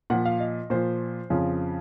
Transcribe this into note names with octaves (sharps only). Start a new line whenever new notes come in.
A#2 F3 F#5
F5
D#5
A#2 F3 C5
F2 C#3 F3 F4